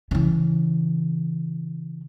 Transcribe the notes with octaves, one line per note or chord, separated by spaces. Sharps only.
C#3 E3